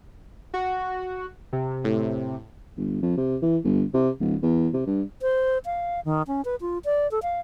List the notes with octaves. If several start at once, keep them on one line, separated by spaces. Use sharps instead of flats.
F#4
C3
A2
G1
F2
C3
E3
G1
C3
D1
E2
C3
G2
C5
F5
D#3
C#4
B4
F4
D5
A4
F5